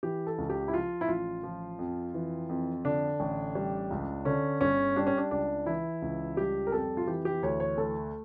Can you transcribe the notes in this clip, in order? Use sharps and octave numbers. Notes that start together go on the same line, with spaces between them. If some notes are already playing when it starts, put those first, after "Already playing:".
E3 G4
A4
C#2
G4
E4
F3 F4
E4
A1 F4
F3
F2
E3
F2
D3 D4
A1
G3
C#2
D3 C#4
G1 C#4
G3 D4
C#4
D4
C#2 D4
E3 E4
C#2
G3 G4
A#4
F2 A4
F4
E3 G4
G4
D2 C#5
C#5
A3 A4